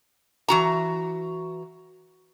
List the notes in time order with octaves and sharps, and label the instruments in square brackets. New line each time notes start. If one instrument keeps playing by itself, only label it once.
[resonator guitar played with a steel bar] E3 F#4 A#5